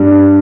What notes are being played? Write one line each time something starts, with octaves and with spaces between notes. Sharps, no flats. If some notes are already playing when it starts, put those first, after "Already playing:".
Already playing: G2